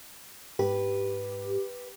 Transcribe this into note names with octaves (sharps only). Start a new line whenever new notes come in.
G#2 G4 B4